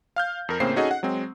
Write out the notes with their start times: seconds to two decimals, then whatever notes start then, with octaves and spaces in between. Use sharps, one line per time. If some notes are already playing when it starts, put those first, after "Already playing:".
0.16 F5 F6 G6
0.49 F2 A#4
0.60 A2 C#3 A#3 C4 C5 C7
0.76 C#4 D#4 F#4 G#4 A4 D#5
0.91 F#5
1.03 F#3 G#3 C4